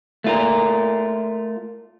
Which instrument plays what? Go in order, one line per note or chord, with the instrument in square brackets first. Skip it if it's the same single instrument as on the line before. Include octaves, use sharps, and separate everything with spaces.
[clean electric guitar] A3 F4 A#4